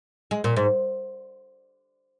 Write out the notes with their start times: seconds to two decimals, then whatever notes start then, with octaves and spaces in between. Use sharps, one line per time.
0.31 G#3
0.44 A#2
0.57 G#2